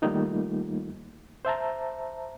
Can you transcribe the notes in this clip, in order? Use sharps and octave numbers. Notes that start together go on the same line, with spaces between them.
D#3 G3 A3 A#3 D#4 F4
C5 E5 A5 A#5